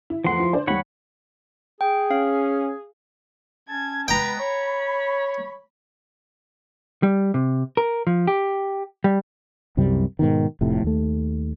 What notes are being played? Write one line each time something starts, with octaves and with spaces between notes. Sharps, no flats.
E4
E2 F3 A3 F#5 C6
E4 F4
D4 C5 D5
D#2 G3 C#5 F#5 B5
G#4 G5
C#4 F5
C#4 A5 G#6
G#3 B3 B4 G5 A#5
C#5 B5
G3
C3
A#4
F3
G4
G3
C2 F#2 C3 G3
G#2 B2 D#3
F1 F2 A2 C3
D#2 A3